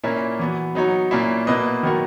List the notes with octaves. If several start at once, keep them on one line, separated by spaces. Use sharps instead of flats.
A#2 A#3 C#4 E4 A#4
E3 B3 F#4
F#3 B3 D#4 F#4 C#5
A#2 A#3 C#4 E4
B2 A#3 E4 B4 D#5
D#3 F#3 B3 F#4 A#4